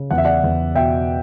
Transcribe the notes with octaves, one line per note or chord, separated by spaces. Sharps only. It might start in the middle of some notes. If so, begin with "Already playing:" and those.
Already playing: C#3
E2 F#5
E5
D5 F#5
E2
B2 E5 G5